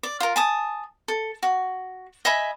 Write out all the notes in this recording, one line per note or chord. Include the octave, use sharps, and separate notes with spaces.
D5
F4 A#4
G#5 A5 D#6
A4
F#4
D#5 E5 G#5 B5